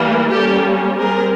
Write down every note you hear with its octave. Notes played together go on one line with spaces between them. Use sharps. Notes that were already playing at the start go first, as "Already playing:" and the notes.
Already playing: E3 G3 A#3
G3 A#3 C#4 G4 A4
G3 C4 G#4 A#4